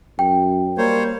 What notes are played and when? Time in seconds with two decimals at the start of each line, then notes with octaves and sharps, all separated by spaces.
0.19 F#2 G5
0.78 G3 A#3 C5 C#5